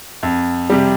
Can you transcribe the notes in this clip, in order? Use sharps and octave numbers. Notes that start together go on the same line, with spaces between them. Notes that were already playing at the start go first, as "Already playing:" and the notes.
F2
C3 G3